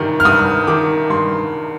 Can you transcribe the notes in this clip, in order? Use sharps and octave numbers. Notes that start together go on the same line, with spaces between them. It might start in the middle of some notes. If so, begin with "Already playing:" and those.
Already playing: G2 D#3 G6
F6
G2 D#6
D#3 D6
G2 C6